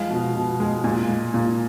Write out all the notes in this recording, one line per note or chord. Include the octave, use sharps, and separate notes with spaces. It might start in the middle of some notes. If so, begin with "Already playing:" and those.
Already playing: F3 G#3 F5
B2
B2
G#3
A#2 G#5
G#3
A#2